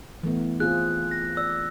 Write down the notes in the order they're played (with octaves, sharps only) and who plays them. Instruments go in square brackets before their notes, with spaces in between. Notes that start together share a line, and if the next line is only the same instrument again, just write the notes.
[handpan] E3 A3 B3
[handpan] C4 F4 G#4 [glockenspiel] F#6
[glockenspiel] A#6
[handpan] D5 [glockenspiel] E6